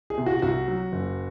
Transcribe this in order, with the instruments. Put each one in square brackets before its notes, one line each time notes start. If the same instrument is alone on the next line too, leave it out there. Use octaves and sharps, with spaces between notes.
[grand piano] G#4
[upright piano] C3
[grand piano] F#4
[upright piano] C2 [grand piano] F#4
[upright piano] F#3
F#1